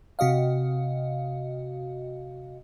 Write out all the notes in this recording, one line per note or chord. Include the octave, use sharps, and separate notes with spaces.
C3 F#4 D#5 F5